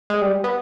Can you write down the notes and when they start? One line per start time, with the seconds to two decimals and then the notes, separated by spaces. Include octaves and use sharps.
0.10 G#3
0.22 G3
0.44 B3